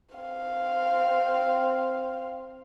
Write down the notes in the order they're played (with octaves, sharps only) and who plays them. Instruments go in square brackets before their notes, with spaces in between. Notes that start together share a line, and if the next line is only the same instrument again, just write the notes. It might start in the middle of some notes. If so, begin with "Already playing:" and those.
[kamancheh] C4 F5